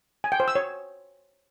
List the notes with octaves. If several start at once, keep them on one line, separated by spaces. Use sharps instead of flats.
G#5
G5
C5
E6
C#5